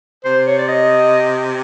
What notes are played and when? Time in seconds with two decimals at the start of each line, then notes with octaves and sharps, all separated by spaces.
0.24 C3 C5
0.47 C#5
0.58 D5
0.68 D#5